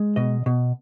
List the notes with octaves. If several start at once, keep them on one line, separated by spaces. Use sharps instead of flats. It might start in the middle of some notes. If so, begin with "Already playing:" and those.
Already playing: G#3
B2 D#5
B2